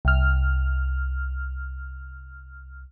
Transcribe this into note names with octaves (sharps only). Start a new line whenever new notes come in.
C2 F6